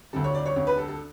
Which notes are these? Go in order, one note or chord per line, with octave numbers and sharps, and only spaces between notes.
D2 D3 A4
C#5
D5
C#5
D2 D3 C#5
B4
A4
A4